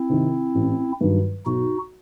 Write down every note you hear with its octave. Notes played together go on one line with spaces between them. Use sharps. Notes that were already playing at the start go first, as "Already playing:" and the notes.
Already playing: C4 E4
C3 D#3
A1
G2 D#3 F#3
B1 D#4 F#4